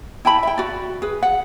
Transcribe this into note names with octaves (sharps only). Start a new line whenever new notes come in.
E4 G5 A5 B5
E5 G5
F#4 D5
G#4 B4
F#5